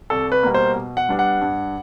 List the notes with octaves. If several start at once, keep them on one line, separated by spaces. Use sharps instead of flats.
C2 A4
B4
B2 G3 A#3
C5
B2
F#5
G3 B3 D4
F#5
G2